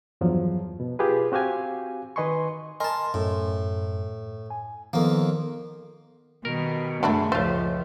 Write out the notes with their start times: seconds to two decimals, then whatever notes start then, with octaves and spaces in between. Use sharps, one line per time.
0.21 E2 G2 F3 F#3
0.80 B2
0.99 F4 G4 G#4 B4
1.32 C4 F#4 G4 F5 G#5
2.16 D#3 B4 D#5 G#5 C6 C#6
2.80 A#4 D#5 G#5 A5 C6
3.14 F#2 A2
4.51 G#5
4.93 F2 D#3 F3 A#3 B3
6.45 B2 D#3 G3 A#4
7.03 F#2 D3 F#3 G#3 A3 D4 E4
7.32 C#2 A2 F3 A3 F4 C5